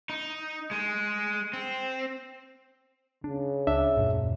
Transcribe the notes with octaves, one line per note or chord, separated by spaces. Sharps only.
D#4
G#3
C4
C#3 D4
C#2 D4 E5
D#1 F#2 A#2